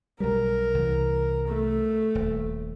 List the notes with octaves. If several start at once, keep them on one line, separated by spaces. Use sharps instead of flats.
B1 F#3 G3 A#4
C2 E3
A3
D#1